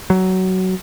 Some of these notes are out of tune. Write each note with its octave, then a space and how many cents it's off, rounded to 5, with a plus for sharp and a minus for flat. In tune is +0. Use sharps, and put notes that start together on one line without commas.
F#3 +15